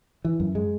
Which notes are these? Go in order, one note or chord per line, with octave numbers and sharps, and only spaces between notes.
E3
F#2
G#3